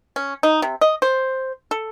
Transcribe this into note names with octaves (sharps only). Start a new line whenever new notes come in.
C#4
D#4
C3
D#5
C5
A4